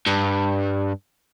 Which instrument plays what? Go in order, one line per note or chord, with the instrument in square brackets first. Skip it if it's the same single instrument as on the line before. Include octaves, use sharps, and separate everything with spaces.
[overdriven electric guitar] G2